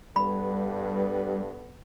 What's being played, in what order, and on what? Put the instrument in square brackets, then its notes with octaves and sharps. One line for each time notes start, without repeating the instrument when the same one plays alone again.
[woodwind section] G2 [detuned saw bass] G3 [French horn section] B3 A4 B4 [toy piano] B5